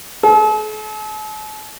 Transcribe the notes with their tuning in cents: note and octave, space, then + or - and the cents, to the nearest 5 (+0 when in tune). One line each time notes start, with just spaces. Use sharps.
A4 -45